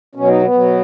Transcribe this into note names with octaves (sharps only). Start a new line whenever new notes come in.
B2 F#3 C#4
D#4
B3
B2 F#3